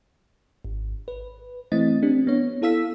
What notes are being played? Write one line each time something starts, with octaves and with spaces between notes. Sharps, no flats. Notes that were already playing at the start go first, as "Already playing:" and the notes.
G#1
B4
E3 A3 C4 E4 D#5 A6
C4 D4 G4
B3 C#5
B3 E4 A4 F5 E6 B6